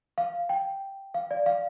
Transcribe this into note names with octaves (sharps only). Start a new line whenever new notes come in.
F5
G5
F5
D5
F5